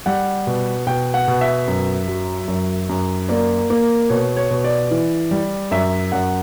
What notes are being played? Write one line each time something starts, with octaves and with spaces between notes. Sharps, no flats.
G3 F#5
B2
B2 G5
F#5
B2
E5
F#2
F#3
F#2
F#2
A#3 D5
A#3
B2 C#5
C#5
B2
D5
E3
G3
F#2 E5
F#2 F#5